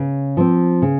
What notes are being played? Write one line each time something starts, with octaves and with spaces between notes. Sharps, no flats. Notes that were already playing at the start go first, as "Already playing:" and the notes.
Already playing: C#3
F3 C4
C#3